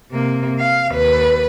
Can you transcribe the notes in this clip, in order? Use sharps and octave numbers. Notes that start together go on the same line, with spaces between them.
C3 A#3
F5
D#2 B4